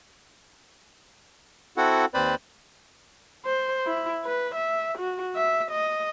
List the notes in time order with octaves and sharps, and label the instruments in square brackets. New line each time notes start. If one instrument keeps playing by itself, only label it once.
[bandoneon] C4 E4 F#4 A4 F#5
D#2 C4 B4 C5 D5 B5
[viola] C5
E4
B4
E5
F#4
E5
D#5